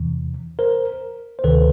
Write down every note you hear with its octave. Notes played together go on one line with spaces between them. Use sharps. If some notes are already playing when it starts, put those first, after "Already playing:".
Already playing: E2 C3 E3
A#4 C5
C5
D2 C3 D#3 A4 B4